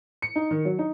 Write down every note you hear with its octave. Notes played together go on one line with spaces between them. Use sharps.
C#7
D#4
D#3
F#3
D#4